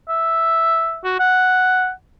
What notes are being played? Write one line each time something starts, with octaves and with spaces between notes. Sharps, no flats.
E5
F#4
F#5